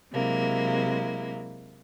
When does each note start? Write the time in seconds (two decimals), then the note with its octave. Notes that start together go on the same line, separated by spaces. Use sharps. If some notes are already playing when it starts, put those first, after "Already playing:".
0.12 C3 F#3 G#3 A#3 E4